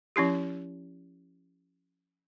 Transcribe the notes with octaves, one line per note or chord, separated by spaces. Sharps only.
F3 C#4 E4 G4